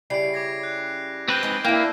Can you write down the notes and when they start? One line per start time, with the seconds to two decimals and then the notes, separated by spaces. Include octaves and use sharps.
0.10 C#3 G3 E4 C7 D7
0.34 D6 G#6 A#6
0.63 F#6
1.28 C4 B4 G6 D7 G7
1.43 G#3 D#4
1.65 A#3 D4 E4 F5 G5